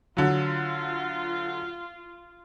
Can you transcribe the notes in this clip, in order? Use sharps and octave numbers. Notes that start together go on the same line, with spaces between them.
D3 F#3 F4